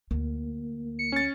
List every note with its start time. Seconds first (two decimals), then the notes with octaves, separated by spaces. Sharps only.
0.11 D2 A#3
0.99 C#7
1.12 C#4 A6